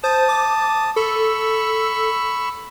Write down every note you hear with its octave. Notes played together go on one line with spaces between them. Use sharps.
C5 A5 D#6
D6
A4 B5 C#6 E6